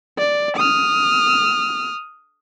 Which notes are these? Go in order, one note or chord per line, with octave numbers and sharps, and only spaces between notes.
D5
D#6 F6